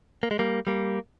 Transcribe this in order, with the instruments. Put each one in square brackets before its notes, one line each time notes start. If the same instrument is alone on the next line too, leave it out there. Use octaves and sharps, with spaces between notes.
[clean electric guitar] A#3
G#3
G3 A#3
G3 A#3